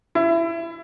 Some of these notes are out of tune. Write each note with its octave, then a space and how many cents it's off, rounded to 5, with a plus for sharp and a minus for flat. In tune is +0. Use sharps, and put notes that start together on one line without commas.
E4 +20